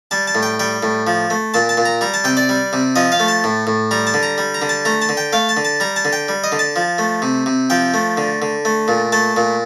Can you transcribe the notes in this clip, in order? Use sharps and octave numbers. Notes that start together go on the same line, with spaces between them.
G3 A5
A5
A2
G5
G3 G5
A2
F3
A3
A#2 A5
A5
A#2
A#5
G3 A#5
A5
C3 G5
D5
G3
C3
F3 D#5
F5
A3
A5
A2
A2
G3 A#5
A5
D3
A#5
G3
A#5
D3
A5
A3 A#5
A5
D3
G5
A3 F5
A5
D3
A5
G3 A#5
A5
D3
G5
G3
D#5
D3
A5
F3
A3
C3
C3
F3 G5
A3
D3
D3
A3
A#2
A3 A5
A#2